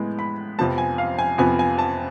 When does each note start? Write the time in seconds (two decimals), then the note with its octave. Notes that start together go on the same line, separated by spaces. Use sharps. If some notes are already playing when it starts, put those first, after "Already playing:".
Already playing: A2 G#3 B3
0.19 B5
0.59 F2 C3 F3 B3 A5
0.78 G#5
0.98 F5
1.19 G#5
1.38 F2 C3 F3 B3 G#5
1.59 G#5
1.78 A5